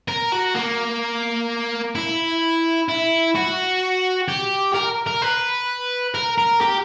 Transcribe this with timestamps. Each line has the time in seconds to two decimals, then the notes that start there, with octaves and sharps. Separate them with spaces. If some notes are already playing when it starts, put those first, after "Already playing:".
0.08 A#4
0.32 F#4
0.55 A#3
1.96 E4
2.89 E4
3.36 F#4
4.28 G4
4.74 A#4
5.07 A#4
5.22 B4
6.15 A#4
6.38 A#4
6.61 G4